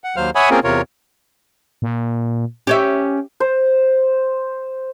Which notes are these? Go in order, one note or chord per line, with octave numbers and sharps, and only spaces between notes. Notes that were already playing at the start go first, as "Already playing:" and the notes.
F#5
D#2 F#3 C5 F5 F6
C#5 E5 F#5 G#5 B5 D#6
A#3 C4 C#4 F4 G#4 A#4
E2 C3 F4 A#4 C#5
A#2
C#4 G4 C#5 E5
C5